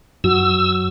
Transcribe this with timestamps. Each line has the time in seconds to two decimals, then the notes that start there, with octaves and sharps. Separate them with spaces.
0.24 F#2 F#3 F#4 E6